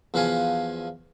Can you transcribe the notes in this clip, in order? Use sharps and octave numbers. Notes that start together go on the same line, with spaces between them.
E2 F3 B4 F5 F#5 G#5